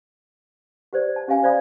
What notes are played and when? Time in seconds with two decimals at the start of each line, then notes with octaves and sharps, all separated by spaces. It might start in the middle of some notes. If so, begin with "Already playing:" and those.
0.93 G4 B4 C5 D5
1.16 A5
1.28 C#4 G4 D#5 F5 G#5
1.43 C5 D5 F5 B5 D#6